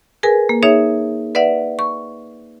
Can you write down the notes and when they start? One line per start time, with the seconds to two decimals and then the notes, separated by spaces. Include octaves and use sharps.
0.23 G#4 A#4 B4 G#5
0.49 A#3
0.63 D#4 G#4 C#5 E5
1.35 B4 D5 E5 F#5
1.79 C#6